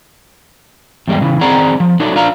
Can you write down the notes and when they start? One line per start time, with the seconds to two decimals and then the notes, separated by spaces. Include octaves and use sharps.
1.08 E2 G#2 G3 G#3 G4
1.21 C#3 E3
1.41 D#3 C4 G#4 D5 F#5 A#5
1.80 F3
2.00 F#3 A3 D4 D#4
2.16 D4 F4 D5 F5 A#5